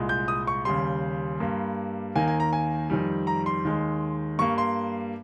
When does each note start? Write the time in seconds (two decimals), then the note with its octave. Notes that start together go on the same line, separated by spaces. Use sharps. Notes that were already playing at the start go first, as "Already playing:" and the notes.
Already playing: C2 A#2 G#3
0.09 G6
0.28 D#6
0.47 C#6
0.65 D#2 C#3 G3 C6
1.40 G2 G3 A#3
2.15 D#2 D#3 A#3 G#5
2.28 G#5
2.40 A#5
2.53 G#5
2.90 F2 D#3 G3
3.27 A#5
3.46 C6
3.65 D#2 D#3 G#3
4.39 G2 G3 A#3 C#6
4.58 C6